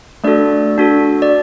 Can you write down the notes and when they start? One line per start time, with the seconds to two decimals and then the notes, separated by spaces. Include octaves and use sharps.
0.24 A3 D4 F#4 A4 D5
0.78 D4 F#4 A4
1.22 D5